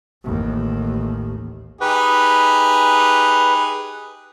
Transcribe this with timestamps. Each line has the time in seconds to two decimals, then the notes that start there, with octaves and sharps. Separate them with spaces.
0.24 A1 D#2
1.81 D#4 G4 G#4 B4